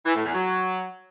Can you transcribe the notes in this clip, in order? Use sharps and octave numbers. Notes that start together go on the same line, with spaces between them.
E3
A2
E2
F#3